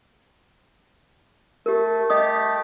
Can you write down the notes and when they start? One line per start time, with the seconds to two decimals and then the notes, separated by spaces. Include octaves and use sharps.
1.66 A3 G4 A#4
2.10 A3 G4 D#5 D#6